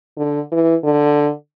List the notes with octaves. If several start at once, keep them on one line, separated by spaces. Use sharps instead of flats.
D3
E3
D3